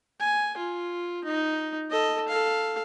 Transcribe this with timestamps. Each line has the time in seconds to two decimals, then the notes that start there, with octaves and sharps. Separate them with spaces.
0.20 G#5
0.57 F4
1.24 D#4
1.91 A4 D#5
2.28 A4 F5